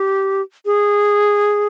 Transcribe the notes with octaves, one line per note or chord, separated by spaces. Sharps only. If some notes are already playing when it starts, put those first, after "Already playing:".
Already playing: G4
G#4